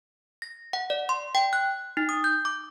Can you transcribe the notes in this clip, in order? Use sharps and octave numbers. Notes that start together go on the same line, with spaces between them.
A#6
F#5
D5
C6
G5
F#6
D#4
D#6
G6
D6